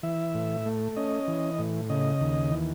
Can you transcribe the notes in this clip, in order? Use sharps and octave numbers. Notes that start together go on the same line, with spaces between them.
E3 E5
A2
A3
C#4 D#5
E3
A2
C#3 D#5
D#2
E3